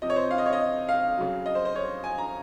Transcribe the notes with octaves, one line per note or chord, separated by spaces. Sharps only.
C3 F3 D#5
C#5
C5
F5
D#5
C#5
D#5
F5
C#3 F#3
D#5
C5
C5
C#5
G#5
A#5